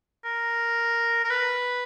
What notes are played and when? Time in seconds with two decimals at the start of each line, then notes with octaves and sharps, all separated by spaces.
0.25 A#4
1.24 A#4
1.30 B4